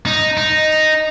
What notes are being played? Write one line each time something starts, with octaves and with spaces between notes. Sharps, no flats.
D#4
D#4